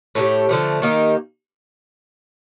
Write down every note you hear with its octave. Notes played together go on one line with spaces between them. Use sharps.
A2 A3 D#4 G4
D3 F3 A3
D#3 A#3 D#4 G4